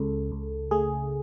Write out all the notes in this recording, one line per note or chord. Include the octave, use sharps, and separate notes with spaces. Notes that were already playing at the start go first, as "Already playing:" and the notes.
Already playing: C#2 C#3 A4
C#2
A3 G#4